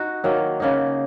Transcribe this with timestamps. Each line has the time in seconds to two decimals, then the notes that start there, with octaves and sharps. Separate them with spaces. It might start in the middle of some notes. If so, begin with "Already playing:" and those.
Already playing: D#4 F#4
0.24 D#3 F#3 A#3
0.60 C#3 A#3 D#4